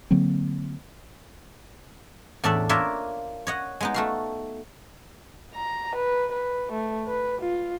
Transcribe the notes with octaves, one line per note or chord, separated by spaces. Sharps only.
D3 F#3 A#3 C4
E2 A2 D4 A4 D5 E5
A#3 D4 F4 A#4 C#5 E5
C#5 D#5 F#5
G#3 B3 D#4
A3 F#4 F5
A#5
B4
B4
A3
B4
F4